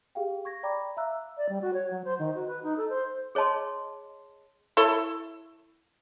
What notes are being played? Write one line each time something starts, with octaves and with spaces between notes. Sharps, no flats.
G4 G#4 F5 G5
C#6 G#6 A#6
D5 G5 A#5 B5 D6
E5 F5 A#5 E6 F#6
D5
G3
F#4
C#5
F#3
C5
D#3
F#4
B4
D#4
A4
C5
G#4 C#5 D#5 A5 C6
E4 A4 C#5